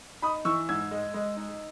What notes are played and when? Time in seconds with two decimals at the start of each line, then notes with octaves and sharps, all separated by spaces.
0.22 D#4 B5 D#6
0.45 E3 C#6 E6
0.69 G#2 E6 G#6
0.91 G#3
1.14 G#3
1.37 D#4